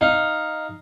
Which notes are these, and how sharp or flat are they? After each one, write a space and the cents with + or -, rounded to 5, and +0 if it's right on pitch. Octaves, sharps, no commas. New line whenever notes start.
D#4 +0 F5 +0